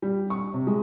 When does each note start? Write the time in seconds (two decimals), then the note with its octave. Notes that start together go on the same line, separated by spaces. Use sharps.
0.02 G3
0.30 C#6
0.54 C3
0.67 G#3